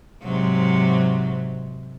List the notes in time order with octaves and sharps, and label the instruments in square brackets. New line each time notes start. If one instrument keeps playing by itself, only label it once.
[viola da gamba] G#2 C3 F#3